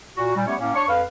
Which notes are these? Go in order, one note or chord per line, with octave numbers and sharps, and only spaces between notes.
A#2 F#4
A#2 G3
G3 A3 B3 C#4 G4 C#5
A2 A#3 C#4 F5
D4 C#5 C#6
F2 B4 F5